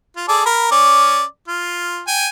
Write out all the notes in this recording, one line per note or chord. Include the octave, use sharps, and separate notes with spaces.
F4
G#4 A4 D5
A#4 B5
C#4 D5
F4
G5 G#5